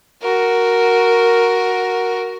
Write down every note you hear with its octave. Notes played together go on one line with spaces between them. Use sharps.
F#4 A#4